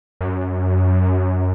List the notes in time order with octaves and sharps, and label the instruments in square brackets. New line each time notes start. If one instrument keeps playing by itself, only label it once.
[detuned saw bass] F#2